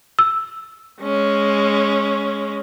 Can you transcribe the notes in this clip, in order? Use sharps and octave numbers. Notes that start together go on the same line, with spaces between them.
E6
G#3 C#4